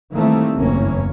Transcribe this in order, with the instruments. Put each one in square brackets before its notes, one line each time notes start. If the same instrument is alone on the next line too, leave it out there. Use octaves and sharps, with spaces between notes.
[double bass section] D#3 E3 G3 A3 A#3 C4
F#1 B1 E2 G2 A#3 C#4